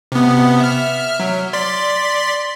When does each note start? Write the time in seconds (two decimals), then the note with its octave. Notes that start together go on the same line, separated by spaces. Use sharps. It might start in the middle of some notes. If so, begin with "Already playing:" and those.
0.12 C3 B3
0.60 E5 F6
1.20 F#3
1.53 D5 C6 B6